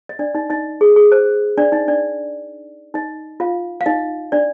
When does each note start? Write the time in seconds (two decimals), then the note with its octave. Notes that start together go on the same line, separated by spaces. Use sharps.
0.09 D#5
0.19 D4 D5
0.35 D#4 D#5
0.50 D#4 D#5
0.81 G#4
0.96 G#4
1.12 C5
1.58 D4 D5
1.72 D#4 D#5
1.88 D4 D5
2.94 D#4 D#5
3.40 F4 F5
3.81 F5
3.86 D#4 D#5
4.32 D4 D5